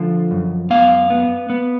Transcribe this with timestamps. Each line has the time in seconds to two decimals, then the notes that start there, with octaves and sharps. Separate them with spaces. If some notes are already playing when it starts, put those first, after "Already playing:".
Already playing: D3 F3
0.31 F#2
0.70 B3 F5
1.10 B3
1.50 B3